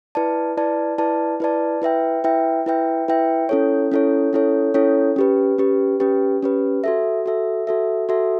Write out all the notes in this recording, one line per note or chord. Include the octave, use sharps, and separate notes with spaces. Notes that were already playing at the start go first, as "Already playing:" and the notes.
E4 B4 D5 A5
E4 B4 D5 A5
E4 B4 D5 A5
E4 B4 D5 A5
E4 B4 E5 G5
E4 B4 E5 G5
E4 B4 E5 G5
E4 B4 E5 G5
C#4 E4 A4 C#5
C#4 E4 A4 C#5
C#4 E4 A4 C#5
C#4 E4 A4 C#5
C#4 G4 B4
C#4 G4 B4
C#4 G4 B4
C#4 G4 B4
F#4 A4 E5
F#4 A4 E5
F#4 A4 E5
F#4 A4 E5